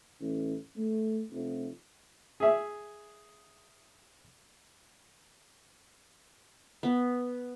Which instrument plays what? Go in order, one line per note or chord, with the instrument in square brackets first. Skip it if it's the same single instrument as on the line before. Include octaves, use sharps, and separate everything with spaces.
[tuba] A1
A3
F1
[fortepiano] G#4 E5
[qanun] B3